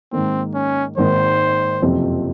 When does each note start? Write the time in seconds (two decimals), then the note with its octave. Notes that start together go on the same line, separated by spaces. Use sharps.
0.12 G#2 D#3 A#3 C4
0.54 C#4
0.98 G#1 G#2 D#3 A#3 C5
1.82 F#1 F2 C3 F3 C4